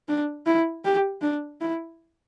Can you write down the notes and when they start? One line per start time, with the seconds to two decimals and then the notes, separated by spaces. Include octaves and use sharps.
0.08 D4
0.46 E4
0.84 G4
1.22 D4
1.61 E4